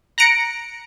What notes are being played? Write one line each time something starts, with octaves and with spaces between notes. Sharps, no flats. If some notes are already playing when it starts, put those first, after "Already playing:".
A#5 F#6 A#6 C#7 D7